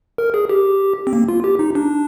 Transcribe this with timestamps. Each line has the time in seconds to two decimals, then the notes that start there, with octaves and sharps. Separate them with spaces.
0.18 A#4
0.34 G#4
0.50 G4
1.07 C4
1.13 A#3
1.29 F4
1.44 G4
1.59 D#4
1.75 D4